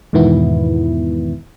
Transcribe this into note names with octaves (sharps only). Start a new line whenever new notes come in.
E2 G#2 B2 D#3 B3 E4